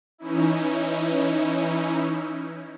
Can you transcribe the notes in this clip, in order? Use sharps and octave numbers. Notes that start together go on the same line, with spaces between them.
E3 C#4 D#4 E4